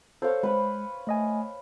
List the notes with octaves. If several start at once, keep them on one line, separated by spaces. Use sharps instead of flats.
A4 C5 C#5 F5
G#3 B4 B5
A3 D#5 G#5